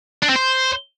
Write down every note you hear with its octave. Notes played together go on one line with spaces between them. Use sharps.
D4
C4
C5